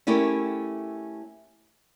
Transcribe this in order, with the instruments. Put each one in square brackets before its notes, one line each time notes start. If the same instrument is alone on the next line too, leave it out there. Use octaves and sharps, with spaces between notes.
[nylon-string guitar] A3 C#4 E4 G4 A4 A#4